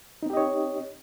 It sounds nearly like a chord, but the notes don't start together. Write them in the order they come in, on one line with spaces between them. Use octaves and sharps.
D#4 C4 G4 D#5 C#5